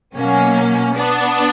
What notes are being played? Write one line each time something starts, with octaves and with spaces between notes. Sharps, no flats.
B2 F#3 A#3 C#4
B3 D4